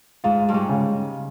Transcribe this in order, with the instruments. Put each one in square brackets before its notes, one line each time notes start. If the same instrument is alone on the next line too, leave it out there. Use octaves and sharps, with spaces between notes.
[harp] G#2 [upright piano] F4
[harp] G2
G#2
[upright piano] C#3